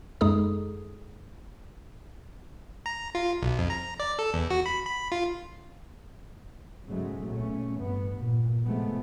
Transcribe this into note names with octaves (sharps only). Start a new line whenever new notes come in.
F#2 G#3 D#4 G#4 A4 D#6
A#5
F4
B1
F2
A#5
D5
A4
E2
F#4
B5
B5
F4
B1 G#2 C#3 F#3 G#3 A3
B1 A#2 A3 C#4
A1 G2 B3
A#2
A2 C3 F3 G#3 A3 B3